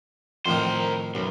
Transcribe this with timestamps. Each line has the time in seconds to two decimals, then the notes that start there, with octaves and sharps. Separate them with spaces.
0.46 F2 A2 D#3 A#4 C5
1.15 B1 F#2